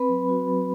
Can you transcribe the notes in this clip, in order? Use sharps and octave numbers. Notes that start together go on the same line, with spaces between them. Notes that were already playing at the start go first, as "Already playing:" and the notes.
Already playing: C4 B4 B5
F#3
F#4
F#3